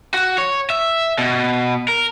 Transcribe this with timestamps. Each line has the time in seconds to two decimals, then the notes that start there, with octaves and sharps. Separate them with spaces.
0.14 F#4
0.38 C#5
0.70 E5
1.18 B2
1.88 A#4